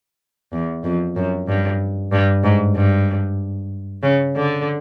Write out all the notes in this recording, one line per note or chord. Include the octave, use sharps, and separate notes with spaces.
E2
F2
F#2
G2
G2
G#2
G2
C#3
D3